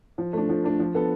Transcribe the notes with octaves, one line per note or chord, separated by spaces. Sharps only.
F3
A3 D4
F3
A3 D4
F3
B3 D4 A4